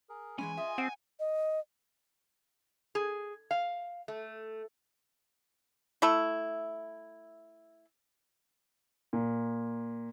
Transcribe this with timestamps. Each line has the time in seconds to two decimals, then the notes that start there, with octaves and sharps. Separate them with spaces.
0.09 G#4 A#4
0.39 E3 G#3 C#4 G#5 B5 C6
0.58 F4 G#4 D#5 E5
0.78 C4 F#5
1.20 D#5
2.95 G#4
3.51 F5
4.08 A3
6.02 A3 E4
9.13 A#2